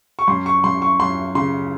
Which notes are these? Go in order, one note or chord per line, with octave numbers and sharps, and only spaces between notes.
C#6
F#2 C6
C#6
F#2 C6
C#6
F#2 C6
C#3 C6